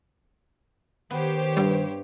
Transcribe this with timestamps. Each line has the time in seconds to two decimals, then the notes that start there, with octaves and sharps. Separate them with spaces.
1.10 D#3 B3 G4 C5 C#5
1.57 G2 G3